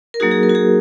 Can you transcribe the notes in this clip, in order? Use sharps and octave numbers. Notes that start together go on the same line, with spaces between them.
A#4
F#3 A#3 D#4 F#4 G#4
G#4
A#4
F#4
G#4